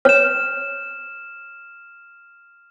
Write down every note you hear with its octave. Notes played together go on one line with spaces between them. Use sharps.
C#5 F6 E7